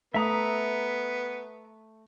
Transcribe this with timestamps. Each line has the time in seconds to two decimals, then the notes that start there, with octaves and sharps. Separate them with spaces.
0.14 A3 B3 E5 A#5 D#6